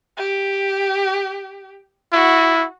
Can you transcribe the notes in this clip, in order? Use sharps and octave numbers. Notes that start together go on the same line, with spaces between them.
G4
E4 F#4